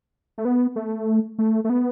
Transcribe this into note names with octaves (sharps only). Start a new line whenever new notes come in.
A3
B3
A3
A3
A3
B3